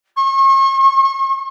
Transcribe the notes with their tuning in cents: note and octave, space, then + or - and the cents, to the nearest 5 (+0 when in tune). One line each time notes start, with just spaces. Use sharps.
C#6 -40